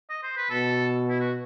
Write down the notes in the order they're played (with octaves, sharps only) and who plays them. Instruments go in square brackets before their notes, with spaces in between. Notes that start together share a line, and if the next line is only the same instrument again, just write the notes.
[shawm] D#5
C5
B4
[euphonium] B2 [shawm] A4
[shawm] E4
F#4